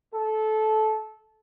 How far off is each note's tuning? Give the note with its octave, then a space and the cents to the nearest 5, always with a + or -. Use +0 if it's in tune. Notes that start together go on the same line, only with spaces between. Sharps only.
A4 -20